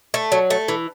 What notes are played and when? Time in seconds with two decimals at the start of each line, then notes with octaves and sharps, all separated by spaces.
0.14 A3
0.32 F#3
0.50 A3
0.68 E3